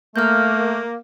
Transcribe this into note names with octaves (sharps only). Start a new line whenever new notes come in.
A3 A#3 F6 G6